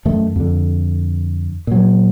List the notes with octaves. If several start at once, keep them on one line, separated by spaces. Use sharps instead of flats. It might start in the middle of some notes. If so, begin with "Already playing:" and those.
F#2 D#3 A3
F2 D3
A#2 F#3